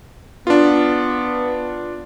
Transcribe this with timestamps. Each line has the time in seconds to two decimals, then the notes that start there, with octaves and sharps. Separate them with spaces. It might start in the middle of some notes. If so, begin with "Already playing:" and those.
0.47 B3 D4 F4